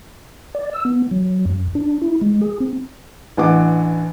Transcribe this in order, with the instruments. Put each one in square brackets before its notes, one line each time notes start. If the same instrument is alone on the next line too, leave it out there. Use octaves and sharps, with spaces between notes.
[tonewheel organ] D5
E6
B3
F#3
F#2
D4
E4
G#3
G#4
C4
[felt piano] A1 E3 D4 F#5 D6